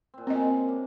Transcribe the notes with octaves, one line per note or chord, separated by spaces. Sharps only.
A#2 C4
F#2 G#3 C4 D#5
A#3 D4